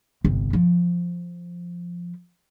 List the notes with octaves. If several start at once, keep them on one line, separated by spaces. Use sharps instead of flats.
G1 C2
F3